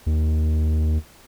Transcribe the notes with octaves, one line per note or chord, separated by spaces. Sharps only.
D#2